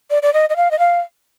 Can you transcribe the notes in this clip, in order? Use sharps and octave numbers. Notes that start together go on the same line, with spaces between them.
D5
D5
D#5
D#5
F5
D#5
F5